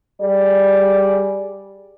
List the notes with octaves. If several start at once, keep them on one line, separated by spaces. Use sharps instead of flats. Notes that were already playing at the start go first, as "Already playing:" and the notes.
G3 G#4 D5